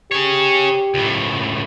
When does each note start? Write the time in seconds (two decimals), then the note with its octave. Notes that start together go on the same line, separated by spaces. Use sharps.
0.11 G4 G#4 C#5
0.94 C#2 A2